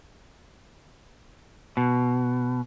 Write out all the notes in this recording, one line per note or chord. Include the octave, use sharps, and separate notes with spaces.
B2